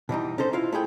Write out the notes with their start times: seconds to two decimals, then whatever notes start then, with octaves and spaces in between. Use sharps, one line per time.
0.09 B2 E3 G3 D#4
0.38 C#4 D#4 A4 C5
0.53 E4 F4 F5
0.72 A3 E4 G#4 G5